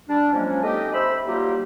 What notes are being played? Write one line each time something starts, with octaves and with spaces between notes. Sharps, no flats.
G3 D4
F3 F#3 G#3 A#3 C#4
A3 C4 D#4 G4 A4 D#5
C5 E5 B5 E6
F#3 G3 A#3 D#4 F4 G4